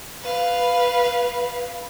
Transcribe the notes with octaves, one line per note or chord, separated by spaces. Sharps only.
B4 F5